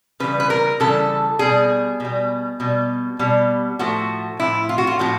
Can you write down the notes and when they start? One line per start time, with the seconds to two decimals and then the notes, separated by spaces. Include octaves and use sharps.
0.20 C#3 E3 G3 B4
0.40 B4
0.50 A#4
0.80 C#3 E3 G3 A4
1.39 B2 G3 G#4
2.00 B2 G3
2.60 B2 G3
3.19 B2 G3
3.79 A2 F3 A3 F#4
4.40 A2 F3 A3 E4
4.69 F4
4.78 F#4
4.87 F4
4.99 A2 F3 A3 F#4